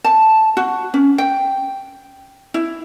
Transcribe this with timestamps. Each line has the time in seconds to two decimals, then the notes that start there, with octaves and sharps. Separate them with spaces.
0.04 A5
0.57 F#4
0.94 C#4
1.18 G5
2.54 E4